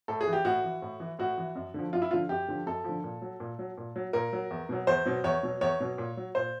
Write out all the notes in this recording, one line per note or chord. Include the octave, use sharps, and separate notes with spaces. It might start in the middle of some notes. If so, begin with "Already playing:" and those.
A2 A4
G#4
E3
G4
A2 F#4
E3
A2
E3
A2 F#4
E3
F#2
D3 F3
F#2 F4
E4
D3 F3 F4
F#2 G4
D3 F3
F#2 A4
D3 F3
A#2
F#3
A#2
F#3
A#2
F#3
A#2 A#4
F#3
E2
B2 F#3
E2 C5
B2 F#3
E2 C#5
B2 F#3
E2 C#5
B2 F#3
A#2
F#3
A#2 C5